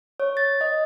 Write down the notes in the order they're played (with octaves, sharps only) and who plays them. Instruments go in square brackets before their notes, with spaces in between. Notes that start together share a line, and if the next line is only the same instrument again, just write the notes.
[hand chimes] C#5
A6
D#5